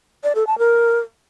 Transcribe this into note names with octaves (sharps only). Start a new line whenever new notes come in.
D5
A4
A5
A#4